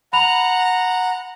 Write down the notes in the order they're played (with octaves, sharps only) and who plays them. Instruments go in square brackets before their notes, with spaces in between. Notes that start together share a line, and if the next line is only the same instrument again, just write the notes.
[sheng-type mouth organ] F#5 A#5 [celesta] B5 F7